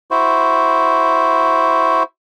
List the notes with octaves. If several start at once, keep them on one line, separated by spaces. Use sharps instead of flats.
E4 F#4 C5